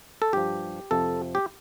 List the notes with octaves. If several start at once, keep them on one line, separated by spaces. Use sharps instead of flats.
A4
G2 F3 G4
F2 C3 F3 A4
G4